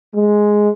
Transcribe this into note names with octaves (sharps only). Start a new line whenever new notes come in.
G#3